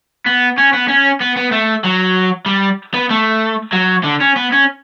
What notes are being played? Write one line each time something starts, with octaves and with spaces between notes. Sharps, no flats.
B3
C#4
B3
C#4
B3
B3
A3
F#3
G3
B3
A3
F#3
D3
C#4
B3
C#4